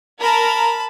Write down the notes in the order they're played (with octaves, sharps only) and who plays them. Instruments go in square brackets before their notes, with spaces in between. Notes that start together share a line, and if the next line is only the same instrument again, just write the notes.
[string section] A#4 [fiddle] A5 B5